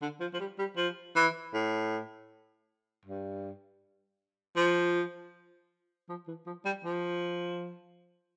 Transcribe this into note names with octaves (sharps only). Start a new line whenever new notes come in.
D3
F3
F3
G3
G3
F3
E3
A2
G2
F3
F3
E3
F3
G3
F3